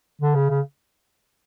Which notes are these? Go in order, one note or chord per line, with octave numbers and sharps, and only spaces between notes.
D3
C#3
C#3